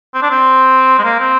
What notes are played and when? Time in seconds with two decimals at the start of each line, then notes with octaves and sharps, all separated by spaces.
0.14 C4
0.22 D4
0.30 C4
0.99 G#3
1.04 A#3
1.19 C4